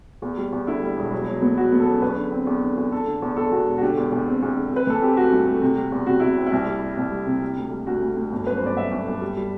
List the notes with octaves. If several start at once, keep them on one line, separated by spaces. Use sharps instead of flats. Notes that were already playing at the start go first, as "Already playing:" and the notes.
E2
G3
E2
D3 E4
G3
E1
F#3
F#3
B3
F#3 F#4
B3
A4
F#2
E2 B4
D3
C4
E2
D3
E2
D3 A4
D3
E2
E2 A4
E2 F#4
E1
F#4
D3 G4
E2
E2
C4
E2
D3
C4 B4
E3 A4
C4 G4
A3 F#4
G2
A3
C3
G3
E2
C3 F#4
C3 E4
C4
E4
C2
G3
G3
C2
G3
C3
G3
D2
G3
D2 F#4
D2
D2
G1
F#2 B4
C5
G1 D5
F#2 E5
G1
G1
G3
G3